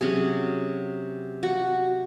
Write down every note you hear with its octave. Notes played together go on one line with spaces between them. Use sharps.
C3 F#3 C#4 G#4
F#4